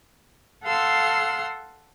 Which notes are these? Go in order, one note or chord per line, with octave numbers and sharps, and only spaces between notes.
A4 F5 F#5 C6 E6